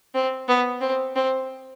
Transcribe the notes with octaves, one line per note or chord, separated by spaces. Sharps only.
C4
B3
C4
C4